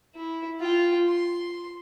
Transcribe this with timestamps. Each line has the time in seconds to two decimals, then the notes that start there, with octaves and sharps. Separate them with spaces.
0.16 E4
0.60 F4 G5
1.07 C6